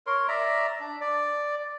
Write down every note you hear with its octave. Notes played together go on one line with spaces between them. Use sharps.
A#4 C#5 C6
D5 E5 A#5
D4
D5